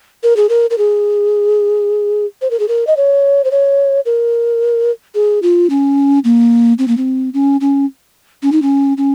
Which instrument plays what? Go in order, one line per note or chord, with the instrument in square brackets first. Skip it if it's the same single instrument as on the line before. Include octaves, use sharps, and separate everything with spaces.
[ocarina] A#4
G#4
A#4
A#4
G#4
C5
A#4
G#4
A#4
D#5
C#5
C5
C#5
A#4
G#4
F4
C#4
A#3
C4
A#3
C4
C#4
C#4
C#4
D#4
C#4
C#4